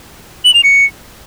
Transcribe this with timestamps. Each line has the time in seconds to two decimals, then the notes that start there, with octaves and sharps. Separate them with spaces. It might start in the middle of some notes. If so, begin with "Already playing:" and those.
0.45 F#7
0.54 F7
0.64 C#7